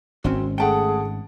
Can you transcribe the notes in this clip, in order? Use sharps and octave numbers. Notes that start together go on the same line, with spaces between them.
G#1 C4 C#4 F#4
A3 G#4 F#5 G5 A5 D7